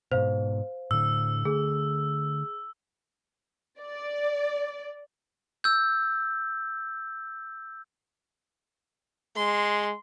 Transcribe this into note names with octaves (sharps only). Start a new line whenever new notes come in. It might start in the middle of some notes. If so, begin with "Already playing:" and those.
G#2 B2 C5 F5
A2 D3 E6
D3 A3 G#4
D5
E6 G6
G#3 C6